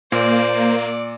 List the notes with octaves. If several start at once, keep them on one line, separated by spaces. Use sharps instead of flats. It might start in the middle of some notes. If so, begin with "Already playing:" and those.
A#2 A#3 C5 D5